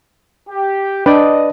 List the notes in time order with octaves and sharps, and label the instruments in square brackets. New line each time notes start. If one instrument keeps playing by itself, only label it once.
[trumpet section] G4
[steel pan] D4 G5 [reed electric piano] B4 D5 [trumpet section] D#5